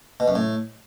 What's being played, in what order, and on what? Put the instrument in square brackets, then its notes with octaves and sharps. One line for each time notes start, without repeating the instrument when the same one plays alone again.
[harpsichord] B2
F#2
A2